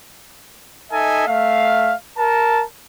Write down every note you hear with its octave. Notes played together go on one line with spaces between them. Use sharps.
D#4 A4 D#5 E5 G#5
A3 E5 F5
A#4 A5